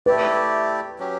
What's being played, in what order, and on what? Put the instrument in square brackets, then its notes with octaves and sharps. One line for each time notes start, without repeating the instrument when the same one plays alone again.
[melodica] A3 E4 G4 D5 [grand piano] B4
[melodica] F#3 C#4 G4